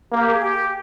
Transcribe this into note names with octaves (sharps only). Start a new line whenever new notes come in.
A#3 G4
G#4
G4